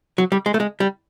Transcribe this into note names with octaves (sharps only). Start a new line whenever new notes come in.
F#3
G3
G#3
A3
G#3
G3